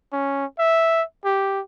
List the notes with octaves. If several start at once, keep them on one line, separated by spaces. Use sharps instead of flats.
C#4
E5
G4